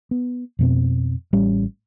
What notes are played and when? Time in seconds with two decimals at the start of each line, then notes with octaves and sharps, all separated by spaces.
0.11 B3
0.59 F2 B2 C4
1.33 A1 G3 C#4